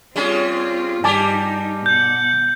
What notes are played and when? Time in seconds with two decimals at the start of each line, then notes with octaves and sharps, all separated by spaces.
0.16 G3 C4 C#4 F4 G#4
1.04 G2 G3 D#4 G4 G#5 A5 D6
1.86 B2 F#5 G6